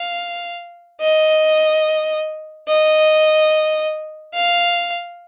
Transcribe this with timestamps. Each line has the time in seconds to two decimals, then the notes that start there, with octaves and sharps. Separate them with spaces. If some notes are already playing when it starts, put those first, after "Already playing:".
Already playing: F5
1.01 D#5
2.68 D#5
4.34 F5